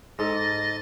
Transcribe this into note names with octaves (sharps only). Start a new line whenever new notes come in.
G#2 A4 D#5 A6